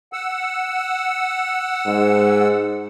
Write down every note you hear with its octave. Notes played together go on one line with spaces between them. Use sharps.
F#5 E6
G#2